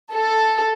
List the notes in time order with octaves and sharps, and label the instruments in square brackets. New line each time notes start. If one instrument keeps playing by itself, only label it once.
[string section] A4